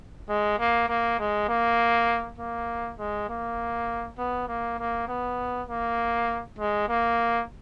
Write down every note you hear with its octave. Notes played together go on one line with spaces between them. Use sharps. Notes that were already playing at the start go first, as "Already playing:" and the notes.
G#3
A#3
A#3
G#3
A#3
A#3
G#3
A#3
B3
A#3
A#3
B3
A#3
G#3
A#3